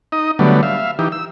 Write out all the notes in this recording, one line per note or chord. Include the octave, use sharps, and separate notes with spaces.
D#4 D#5
D3 F#3 G3 A3 B3
E5 F5
E3 D#4 G4
E6